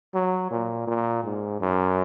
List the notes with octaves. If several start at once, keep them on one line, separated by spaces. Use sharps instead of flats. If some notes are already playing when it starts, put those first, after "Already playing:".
F#3
A#2
A#2
G#2
F#2